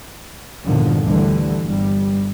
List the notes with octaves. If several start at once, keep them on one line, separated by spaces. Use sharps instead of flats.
E2 G2 A#2 D3 D#3 F3
D2 D3 E3 G3
G1 G3